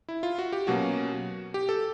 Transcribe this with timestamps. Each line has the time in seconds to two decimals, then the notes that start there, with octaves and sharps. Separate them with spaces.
0.08 E4
0.23 F4
0.39 F#4
0.53 G4
0.67 B2 F#3 A#3 C#4 F#4
1.54 G4
1.69 A4